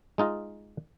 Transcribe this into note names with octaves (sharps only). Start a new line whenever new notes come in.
G#3 D#4 F4 D#5